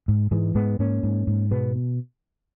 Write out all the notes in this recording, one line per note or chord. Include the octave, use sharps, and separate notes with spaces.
G#2
G#2 E3 G#3
G#2 G#3 B3
G#2 A#3 C#4
G#2
G#2
B2 G#3 B3